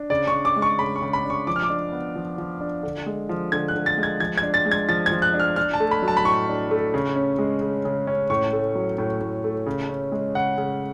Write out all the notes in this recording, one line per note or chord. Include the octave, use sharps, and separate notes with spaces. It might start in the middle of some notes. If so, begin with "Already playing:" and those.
Already playing: D4
C#3 D5
C#6
D4
D6
G#3
C#6
C#3 B5
C#6
C#3
B5
D4
C#6
F3 D6
F6
D6
D4
B3
F3
F3
D4
D3
G#3
F3
D3 G#6
F#6
D3
A6
G#3
G#6
F3 G#6
G#6
D4
A6
G#3
G#6
F3 A6
G#6
F3
F#6
D4
F6
D4 F6
A5
A3
B5
F#3
A5
B5
A2 C#6
D4
A3
C#3
C#4
G#3
C#3
C#3
C#4
A2 C#6
A3
F#3
A2
A2
A3
C#3
C#4
G#3
C#3 F#5
C#3